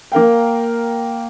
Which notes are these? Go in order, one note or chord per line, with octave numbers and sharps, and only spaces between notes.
A#3 A#4 F5 G5